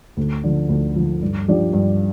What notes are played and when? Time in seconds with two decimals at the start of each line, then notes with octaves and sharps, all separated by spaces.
0.17 D2
0.44 D3 F3
0.69 D2
0.96 D3 F3
1.22 G2
1.48 F3 D4 G4
1.73 G2